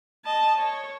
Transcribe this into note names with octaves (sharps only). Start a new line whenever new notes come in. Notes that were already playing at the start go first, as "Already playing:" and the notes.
D#5 A5
C#5